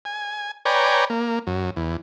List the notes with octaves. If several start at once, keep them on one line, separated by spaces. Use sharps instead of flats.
G#5
B4 C#5 D5 G5 G#5 A#5
A#3
F#2
E2